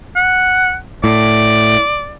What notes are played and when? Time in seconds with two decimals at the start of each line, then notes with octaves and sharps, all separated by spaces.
0.16 F#5
1.04 A2 D5